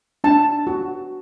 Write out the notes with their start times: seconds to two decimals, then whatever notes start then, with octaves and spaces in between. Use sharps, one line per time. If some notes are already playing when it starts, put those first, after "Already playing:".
0.24 D4 A5
0.67 F#4